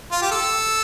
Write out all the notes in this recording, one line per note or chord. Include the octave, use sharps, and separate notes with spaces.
F4
G4
A4